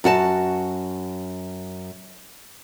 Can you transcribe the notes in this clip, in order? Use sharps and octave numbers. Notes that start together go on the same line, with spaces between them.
F#2 F#4 A#4 A5